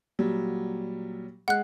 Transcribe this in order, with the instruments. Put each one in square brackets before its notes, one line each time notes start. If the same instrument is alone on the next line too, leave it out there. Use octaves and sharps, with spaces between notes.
[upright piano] A#2 F#3 G3
[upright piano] G#3 [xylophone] F#5 F#6